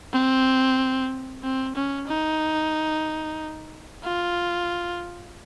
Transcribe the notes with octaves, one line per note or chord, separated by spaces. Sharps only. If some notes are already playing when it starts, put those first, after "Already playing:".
C4
C4
C#4
D#4
F4